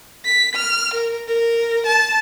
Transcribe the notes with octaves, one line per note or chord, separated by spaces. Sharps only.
B6
F6
A#4
A#4
A5